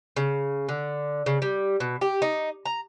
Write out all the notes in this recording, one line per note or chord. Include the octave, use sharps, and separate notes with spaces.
C#3
D3
C#3
G3
B2
G4
D#4
A#5